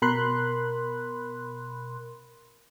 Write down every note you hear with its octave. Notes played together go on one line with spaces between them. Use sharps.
B2 A#4 B5 C6 F#6